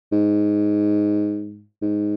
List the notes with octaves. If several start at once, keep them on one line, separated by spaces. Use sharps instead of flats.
G#2
G#2